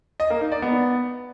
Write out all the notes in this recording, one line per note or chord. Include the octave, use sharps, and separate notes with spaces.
D#5
A#3
D#4
D5
B3